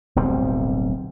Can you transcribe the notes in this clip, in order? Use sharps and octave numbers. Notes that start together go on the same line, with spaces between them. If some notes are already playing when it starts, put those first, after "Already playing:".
D1 B1 G3 C4